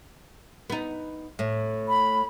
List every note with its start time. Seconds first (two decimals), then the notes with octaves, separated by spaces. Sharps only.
0.70 B3 D#4
1.39 A2
1.89 B5